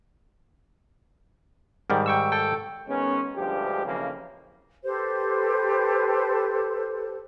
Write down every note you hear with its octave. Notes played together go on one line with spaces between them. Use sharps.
G#2 D#3 G3 A#4
G5 C#6 E6
A4 G5
D#3 G#3 B3 C#4
D2 G2 F3 G#3 G4
B1 F2 C#3 E3 F3 A#3
G4 A4 B4 C5